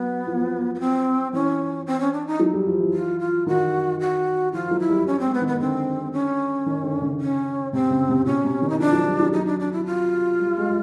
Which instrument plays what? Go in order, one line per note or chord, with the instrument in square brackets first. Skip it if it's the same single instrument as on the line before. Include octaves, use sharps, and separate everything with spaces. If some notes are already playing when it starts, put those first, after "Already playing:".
Already playing: [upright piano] F#3 [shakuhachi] B3
[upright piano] F3
[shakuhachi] B3
C4
[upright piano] E3 [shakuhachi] C#4
[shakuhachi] C4
C#4
D4
D#4
[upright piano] F#3
G3
F3
E3
[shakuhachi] F4
F4
[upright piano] D#3 [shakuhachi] F#4
[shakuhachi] F#4
[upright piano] F3 [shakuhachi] F4
[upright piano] F#3
[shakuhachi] E4
[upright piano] G3
[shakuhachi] C#4
C4
[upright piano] G#3
[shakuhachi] B3
[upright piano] D#3
[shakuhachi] B3
[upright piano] D3 [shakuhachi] C4
[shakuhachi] C#4
[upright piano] D#3
D3
C#3
[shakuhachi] C#4
[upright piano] C3 [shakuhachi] C4
[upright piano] C#3
C3
[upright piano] B2 [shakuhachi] C#4
[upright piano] C3
D#3
[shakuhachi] D#4
[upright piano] F3 [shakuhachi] D4
[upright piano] F#3
G3
F#3
[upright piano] F#3 [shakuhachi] D#4
[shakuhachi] D4
D4
E4
F4
[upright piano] G3
G#3